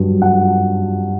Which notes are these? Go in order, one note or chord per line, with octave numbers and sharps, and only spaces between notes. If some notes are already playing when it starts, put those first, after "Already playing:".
Already playing: G2 F#3
F#5